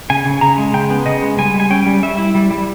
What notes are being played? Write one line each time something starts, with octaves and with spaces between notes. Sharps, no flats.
C#3 G#5
C#3
C#3 A#5
G#3
C#3 G5
B3
C#3 D#5
G#3
G3 G#5
G3
G#5
C#4 G5
G3
G3 E5
E4
G3
G3